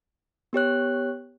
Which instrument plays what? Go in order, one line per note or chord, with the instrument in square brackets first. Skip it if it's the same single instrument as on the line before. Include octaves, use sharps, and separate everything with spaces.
[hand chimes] B3 G4 C#5 F#6